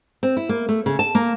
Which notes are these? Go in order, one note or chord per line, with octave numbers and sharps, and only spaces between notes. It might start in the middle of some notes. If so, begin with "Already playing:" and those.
C4
E4
A#3
A3
C#3
A5
A#3